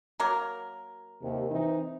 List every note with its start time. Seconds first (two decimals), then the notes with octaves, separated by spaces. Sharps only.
0.20 F#3 A#3 A#4
1.22 D#2 C3
1.51 E3 C4 D#4